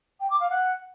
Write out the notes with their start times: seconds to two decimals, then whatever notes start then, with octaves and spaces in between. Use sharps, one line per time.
0.20 G5
0.30 D6
0.40 F5
0.50 F#5